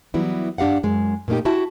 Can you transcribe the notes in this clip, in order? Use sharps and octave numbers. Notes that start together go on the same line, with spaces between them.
E3 F#3 G3 B3 E4
G2 D4 G4 F5 F#5
F#2 G#3
A#2 A3 A#3 D#4 G4
E4 F#4 G4 E5 A5